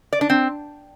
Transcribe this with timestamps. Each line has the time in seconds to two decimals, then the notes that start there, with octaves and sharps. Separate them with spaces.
0.13 D5
0.21 D4
0.30 C4